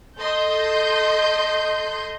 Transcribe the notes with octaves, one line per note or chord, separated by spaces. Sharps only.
A4 D#5 C6 G6